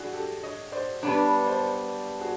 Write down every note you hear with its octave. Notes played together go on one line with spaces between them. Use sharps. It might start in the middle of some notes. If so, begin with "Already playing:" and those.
Already playing: D4 E4 F#4 G#4
G4 A4
C#5 D#5
C5 D5
G3 B3 D4 B4 C#5
C5 D5
F#4 G#4